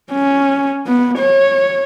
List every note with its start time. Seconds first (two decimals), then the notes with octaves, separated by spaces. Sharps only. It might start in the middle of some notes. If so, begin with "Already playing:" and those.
0.12 C#4
0.87 B3
1.19 C#5